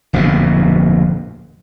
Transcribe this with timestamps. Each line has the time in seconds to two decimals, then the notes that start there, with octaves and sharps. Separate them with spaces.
0.13 D1 A#1 F2 B2